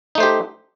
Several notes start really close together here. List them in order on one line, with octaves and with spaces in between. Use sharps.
D#4 A3 C5 G4